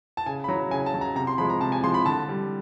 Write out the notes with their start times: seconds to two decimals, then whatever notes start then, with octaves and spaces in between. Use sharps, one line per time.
0.17 A5
0.26 C#3 G#5
0.44 B5
0.49 F#3 A#5
0.71 C#3 G#5
0.86 A5
0.94 F#3
1.01 A#5
1.16 C3 A#5
1.27 C6
1.38 F3 G#3 B5
1.49 A#5
1.61 C3 A5
1.72 G#5
1.84 F3 G#3 C6
1.94 B5
2.06 D3 A5
2.29 G3